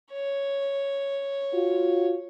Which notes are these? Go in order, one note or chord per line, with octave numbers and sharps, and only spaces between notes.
C#5
F4 F#4